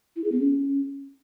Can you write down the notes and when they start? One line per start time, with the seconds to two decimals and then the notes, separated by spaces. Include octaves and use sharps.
0.16 E4
0.24 G#4
0.32 B3
0.40 C#4